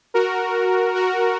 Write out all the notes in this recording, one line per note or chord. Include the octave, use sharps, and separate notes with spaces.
F#4 A#4
F#4 A#4